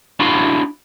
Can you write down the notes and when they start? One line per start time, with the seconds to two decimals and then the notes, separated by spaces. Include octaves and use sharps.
0.20 D4 E4 F#4 F5 B5 C6